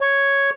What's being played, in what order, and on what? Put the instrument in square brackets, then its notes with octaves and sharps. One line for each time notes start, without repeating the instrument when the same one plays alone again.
[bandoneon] C#5